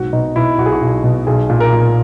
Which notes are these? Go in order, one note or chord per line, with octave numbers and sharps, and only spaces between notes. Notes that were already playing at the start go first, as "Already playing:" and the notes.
Already playing: B1 G#2 F#4
B2 D#4
B2 E4
B1 F#4
G#4
F#4
B1
B2
B1 G#4
A#2
A#4
A#2